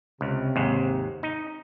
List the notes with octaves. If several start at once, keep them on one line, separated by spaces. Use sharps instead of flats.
C#2 C3
D#2 G#2
D#4